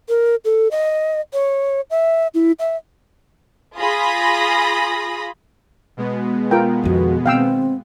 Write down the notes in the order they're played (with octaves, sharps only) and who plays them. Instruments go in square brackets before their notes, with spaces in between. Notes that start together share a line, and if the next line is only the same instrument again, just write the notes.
[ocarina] A#4
A4
D#5
C#5
E5
E4
E5
[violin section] F4 G#4 B5 D#6 A#6
[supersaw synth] B2 G#3 B3
[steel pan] F4 A#4 G5
[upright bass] F2 D#3 [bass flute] F#4
[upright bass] D#3 [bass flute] C4 [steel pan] F5 G5 E6